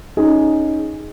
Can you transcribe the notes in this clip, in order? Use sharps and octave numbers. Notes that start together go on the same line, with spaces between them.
C#4 D#4 G#4